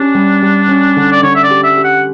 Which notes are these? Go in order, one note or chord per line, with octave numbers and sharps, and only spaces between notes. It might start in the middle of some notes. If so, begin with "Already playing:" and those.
Already playing: C#4 D4 G4
G3
G3
C#4
D3
D5
D3 C#5
E5
D5
G4
E5
G4
F#5